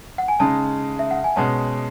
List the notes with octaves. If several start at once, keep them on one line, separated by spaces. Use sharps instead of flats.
F#5
G#5
C#3 G#3 D#4 A5
E5
F#5
G#5
B2 G#3 C#4 A5